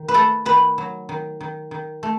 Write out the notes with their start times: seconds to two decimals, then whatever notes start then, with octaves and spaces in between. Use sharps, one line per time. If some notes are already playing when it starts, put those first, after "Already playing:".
Already playing: D#3
0.08 B4
0.14 A3 A4
0.45 D#3 B4
0.78 F#3
1.09 D#3
1.41 D#3
1.71 D#3
2.03 A3